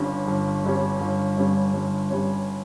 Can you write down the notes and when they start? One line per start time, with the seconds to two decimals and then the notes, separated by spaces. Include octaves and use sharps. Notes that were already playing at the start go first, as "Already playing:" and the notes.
Already playing: G1 G2 G3 C#4
0.28 G1
0.64 G2 G3 C#4
1.01 G1
1.37 G2 G3 C#4
1.74 G1
2.10 G2 G3 C#4